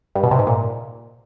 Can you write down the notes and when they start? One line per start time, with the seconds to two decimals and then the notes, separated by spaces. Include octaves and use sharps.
0.15 G2
0.23 B2
0.31 C3
0.39 G#2
0.47 A#2